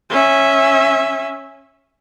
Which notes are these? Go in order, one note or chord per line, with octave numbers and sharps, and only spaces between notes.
C#4 E5